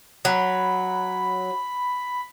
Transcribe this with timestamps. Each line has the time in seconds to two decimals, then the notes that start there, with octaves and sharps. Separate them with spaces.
0.25 F#3 B5